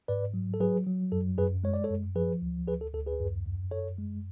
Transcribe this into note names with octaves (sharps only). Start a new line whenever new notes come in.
G#2 B4 D5
F#3
A4
F#3 G#4 B4
F#3
F#2 A4
F#2 G#4 B4
G#3 C#5
D5
A4 C#5
F#2
F3 G#4 B4
D2
D2 G#4 B4
A4
D2 A4
G#4 B4
F#2
F#2
F#2 A4 C#5
G#3